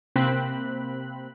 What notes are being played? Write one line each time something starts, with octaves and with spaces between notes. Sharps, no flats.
C3 A#3 C4 B5 F#6